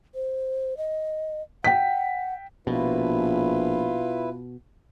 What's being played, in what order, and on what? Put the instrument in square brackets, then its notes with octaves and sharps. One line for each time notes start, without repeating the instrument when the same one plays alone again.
[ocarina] C5
D#5
[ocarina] F#5 [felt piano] G5 B6
[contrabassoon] A#1 [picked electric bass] B2 [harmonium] E4 B4 [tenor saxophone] F4